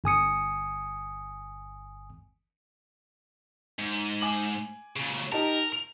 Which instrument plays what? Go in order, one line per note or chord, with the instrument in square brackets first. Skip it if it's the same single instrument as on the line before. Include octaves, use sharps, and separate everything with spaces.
[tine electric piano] G1 G#5 D#6 C#7
[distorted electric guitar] G#2
[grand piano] G#5 D6 F#7
[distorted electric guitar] A#2 C#3
[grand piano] D#4 G4 A5 [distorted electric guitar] A#4
[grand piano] F7